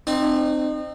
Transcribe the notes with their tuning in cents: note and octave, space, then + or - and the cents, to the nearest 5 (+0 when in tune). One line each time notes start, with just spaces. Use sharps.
C4 +0 D#4 -35